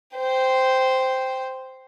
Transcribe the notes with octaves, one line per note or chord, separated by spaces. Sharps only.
C5 G5